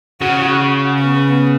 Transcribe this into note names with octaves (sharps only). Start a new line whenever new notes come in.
C#3 F#4
B3